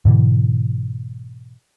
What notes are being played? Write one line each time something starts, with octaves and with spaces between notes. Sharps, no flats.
G#2 B2 D3 E3